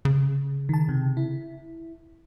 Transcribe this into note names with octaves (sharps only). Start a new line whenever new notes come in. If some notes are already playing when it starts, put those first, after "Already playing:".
C#3
D#3 A5
C3
E4